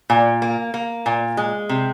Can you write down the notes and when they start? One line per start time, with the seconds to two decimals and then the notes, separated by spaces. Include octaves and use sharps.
0.10 A#2
0.42 A#3
0.74 A#3
1.06 A#2
1.37 G#3
1.69 C3